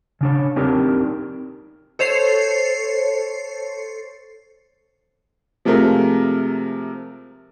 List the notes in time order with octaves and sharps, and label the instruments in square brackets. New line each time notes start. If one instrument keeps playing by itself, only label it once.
[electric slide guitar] C#3 D4 C#5
C4 D4 D#4 G4 A#4
[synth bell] A4 C5 C#5 C7
[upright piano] C3 F3 G#3 A3 A#4